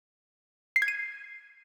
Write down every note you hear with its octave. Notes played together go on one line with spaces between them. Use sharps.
C7
G#6
D#7